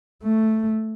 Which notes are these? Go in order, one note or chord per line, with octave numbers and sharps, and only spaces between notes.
A3